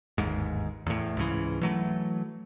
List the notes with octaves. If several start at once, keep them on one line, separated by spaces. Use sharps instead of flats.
G1 D#2 G#2
E2 A2
C#2 G#2 C#3 E3
E3 F#3 A3